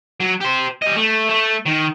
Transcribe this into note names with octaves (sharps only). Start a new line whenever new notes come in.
F#3
G4 C5
G3 D#5
A3
A3
D#3